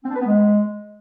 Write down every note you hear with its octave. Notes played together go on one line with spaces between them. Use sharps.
C4
D4
B4
B3
G#3